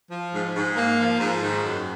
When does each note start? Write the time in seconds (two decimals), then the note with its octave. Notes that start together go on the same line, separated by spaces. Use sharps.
0.11 F3
0.33 G#2
0.54 G#2
0.76 A#3
0.98 F3
1.20 G#2
1.42 D#3
1.64 F#2